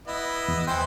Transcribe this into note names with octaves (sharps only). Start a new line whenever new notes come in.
B3 E4 D#5
E2
E3 C5 G5